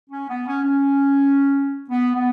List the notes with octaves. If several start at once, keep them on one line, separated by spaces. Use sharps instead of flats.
C#4
B3
C#4
C#4
B3
B3